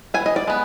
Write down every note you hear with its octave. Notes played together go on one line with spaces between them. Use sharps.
E3 G#5
D#5
D5
G#3 B3